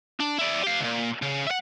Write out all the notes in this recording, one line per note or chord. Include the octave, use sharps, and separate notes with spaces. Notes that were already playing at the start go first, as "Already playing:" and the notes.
D4
E4 D5
G4 F5
C#2 A#2
C#3
E5 F#5